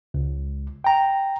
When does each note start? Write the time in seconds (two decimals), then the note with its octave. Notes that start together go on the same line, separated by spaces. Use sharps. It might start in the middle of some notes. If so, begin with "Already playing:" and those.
0.14 C#2
0.84 G5 A#5